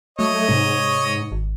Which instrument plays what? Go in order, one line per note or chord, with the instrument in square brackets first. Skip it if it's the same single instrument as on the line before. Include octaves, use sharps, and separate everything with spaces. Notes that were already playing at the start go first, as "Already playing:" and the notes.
[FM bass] F#3 [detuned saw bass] A3 [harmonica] C#5 D#5
[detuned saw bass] G#2 [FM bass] C3
[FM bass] G#1